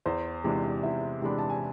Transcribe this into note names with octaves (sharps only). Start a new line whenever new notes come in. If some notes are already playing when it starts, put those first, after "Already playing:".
E2 C5
C3 E3 G#3 D4
E2 E4 E5
C3 E3 G#3 D4 B5
A5
G#5